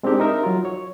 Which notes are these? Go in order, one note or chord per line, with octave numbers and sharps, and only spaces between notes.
G#3 C4 D4 D#4 G4 A#4
D#4 A#4 E5
F#3 F4
C#5